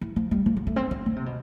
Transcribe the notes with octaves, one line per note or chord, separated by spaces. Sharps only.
E3
F3
G3
F3
F3
B3
A3
C4
B3
D3
C3
B2